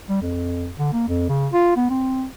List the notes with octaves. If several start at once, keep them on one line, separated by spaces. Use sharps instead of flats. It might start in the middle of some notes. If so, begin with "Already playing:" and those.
G3
F2
D3
A#3
F2
C#3
F4
B3
C4